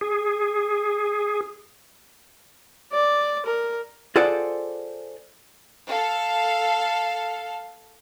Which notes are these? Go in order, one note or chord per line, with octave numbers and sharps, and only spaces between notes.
G#4
D5
A#4
F4 G#4 A4 C5 D5 F#5
A4 F5